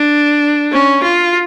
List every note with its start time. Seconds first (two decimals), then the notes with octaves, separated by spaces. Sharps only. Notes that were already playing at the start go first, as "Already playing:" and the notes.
Already playing: D4
0.72 C#4
1.03 F4